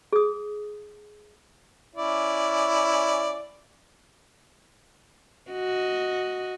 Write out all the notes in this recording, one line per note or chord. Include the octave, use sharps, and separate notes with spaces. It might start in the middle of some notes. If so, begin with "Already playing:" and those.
G#4 D#6
C#4 E4 D5
F#4 D#5